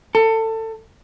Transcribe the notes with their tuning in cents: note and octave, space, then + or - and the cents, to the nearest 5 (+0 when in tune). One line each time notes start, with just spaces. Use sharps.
A4 +25